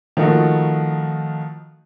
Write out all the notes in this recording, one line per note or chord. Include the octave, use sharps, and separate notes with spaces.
D#3 F3 A3 D#4 F#4